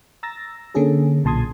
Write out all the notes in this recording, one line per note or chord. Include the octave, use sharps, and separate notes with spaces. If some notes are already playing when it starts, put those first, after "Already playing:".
A#5 E6 A6 A#6
D3 A#3 C#4 G#4 A4
B1 A#2 A5 C6 D#6 G#6